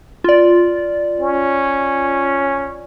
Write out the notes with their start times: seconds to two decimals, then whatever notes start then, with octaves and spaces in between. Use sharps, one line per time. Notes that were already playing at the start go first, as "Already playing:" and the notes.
0.24 F4 D5
1.20 C#4